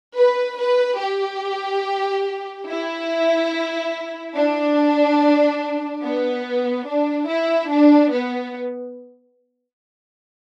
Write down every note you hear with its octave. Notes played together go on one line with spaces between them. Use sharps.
B4
B4
G4
E4
D4
B3
D4
E4
D4
B3